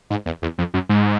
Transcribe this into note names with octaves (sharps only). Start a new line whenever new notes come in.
G#2
E2
E2
F2
F#2
G#2